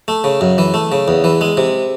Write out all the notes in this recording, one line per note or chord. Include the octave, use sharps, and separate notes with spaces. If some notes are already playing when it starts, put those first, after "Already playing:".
A3
C#3
F#2
E3
A3
C#3
E2
E3
G#3
C3